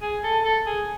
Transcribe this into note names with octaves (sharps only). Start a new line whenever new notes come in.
G#4
A4
A4
G#4